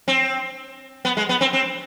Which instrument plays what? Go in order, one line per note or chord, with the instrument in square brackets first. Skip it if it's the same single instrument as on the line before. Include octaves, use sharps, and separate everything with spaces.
[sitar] C4
B3
G#3
B3
C4
C4